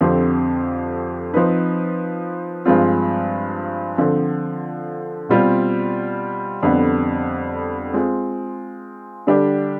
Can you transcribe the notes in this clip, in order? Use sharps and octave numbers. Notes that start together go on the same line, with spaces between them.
F2 D3 F3 C4 G4
F3 C4 D#4 B4
G2 F3 G#3 C4 F4
D3 F3 C4
B2 G3 C4 F4
F2 D3 G3 B3 D4
G#3 C4 F4
D3 G3 D4 G4